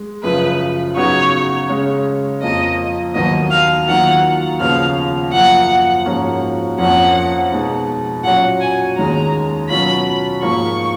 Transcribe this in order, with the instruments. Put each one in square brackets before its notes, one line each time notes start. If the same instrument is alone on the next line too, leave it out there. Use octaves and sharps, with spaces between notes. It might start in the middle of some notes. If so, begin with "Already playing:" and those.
Already playing: [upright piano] G#3
[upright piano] F#2 C#3 F3 [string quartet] B4
[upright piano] C#3 F#3 B3 D#4 F#4 [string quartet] C#5
[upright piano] C#3 G#3 C#4
[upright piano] F2 F3 A#3 [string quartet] D#5
[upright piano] D#2 D#3 F#3 B3 [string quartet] D#5
[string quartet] F5
[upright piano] D#3 F#3 A#3 F4 [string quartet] F#5
[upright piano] D#2 C#3 F3 B3 [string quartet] F5
[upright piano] F#2 F3 A#3 [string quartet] F#5
[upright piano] G#2 F3 A#3 C#4 F#4
[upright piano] F2 F3 A#3 C#4 [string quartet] F#5
[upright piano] B2 G#3 D#4
[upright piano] A#2 F#3 C#4 F#4 [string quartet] F#5
[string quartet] G#5
[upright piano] D#2 D#3 G#3 C#4 [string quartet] A#5
[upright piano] B2 F#3 C#4 F4 [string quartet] B5
[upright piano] G#2 F3 A#3 [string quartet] C#6